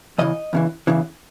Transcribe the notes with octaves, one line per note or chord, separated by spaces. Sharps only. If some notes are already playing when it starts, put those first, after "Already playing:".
E2 C#3 E3 D#5
E2 C#3 E3
E2 C#3 E3